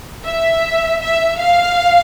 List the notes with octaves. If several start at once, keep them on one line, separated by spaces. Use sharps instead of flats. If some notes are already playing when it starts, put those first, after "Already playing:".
E5
E5
F5